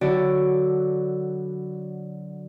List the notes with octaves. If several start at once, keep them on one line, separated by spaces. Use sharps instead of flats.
D3 F#3 E4 F#4 C#5 D5